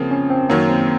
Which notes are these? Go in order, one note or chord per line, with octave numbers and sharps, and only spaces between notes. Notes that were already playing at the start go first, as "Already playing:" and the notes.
Already playing: C#3 F3 A#3 C4
C#4
C4
F#2 D#3 F#3 A#3
C4